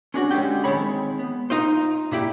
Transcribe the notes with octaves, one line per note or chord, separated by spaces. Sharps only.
C#4 D4 F#4
D3 G#3 C#4 G4 G5
D#3 G#3 C4 C#5 B5
B3
D#4 F4 C5
A#2 E4 G4